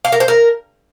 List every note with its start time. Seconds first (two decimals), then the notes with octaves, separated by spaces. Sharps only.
0.05 F5
0.12 A#4
0.20 C5
0.28 A#4